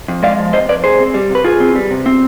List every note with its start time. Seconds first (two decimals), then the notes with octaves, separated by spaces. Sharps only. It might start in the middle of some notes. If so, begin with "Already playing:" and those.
0.08 F2
0.23 G#3 D5 F5
0.39 F3
0.53 C3 C5 D#5
0.69 F2 B4 D5
0.84 C3 G#4 C5
0.99 C4
1.14 G3
1.30 C3
1.35 B4
1.44 C3 F4 G#4
1.60 C4
1.75 G3
1.91 C3
2.06 C4